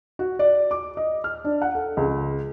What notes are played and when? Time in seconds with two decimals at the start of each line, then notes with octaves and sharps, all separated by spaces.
0.19 F#4
0.39 D5
0.71 D6
0.97 D#5
1.24 F6
1.45 D4
1.62 F#5
1.75 A4
1.97 C#2